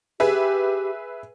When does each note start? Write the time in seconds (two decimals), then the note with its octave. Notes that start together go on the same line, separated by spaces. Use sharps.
0.20 G4 G#4 B4 E5